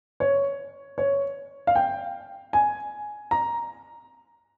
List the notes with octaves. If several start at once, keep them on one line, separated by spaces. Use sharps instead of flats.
C#5
C#5
F5
G5
G#5
A#5